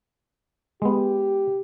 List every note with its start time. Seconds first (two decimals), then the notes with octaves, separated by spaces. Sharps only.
0.82 G#3 B3 G4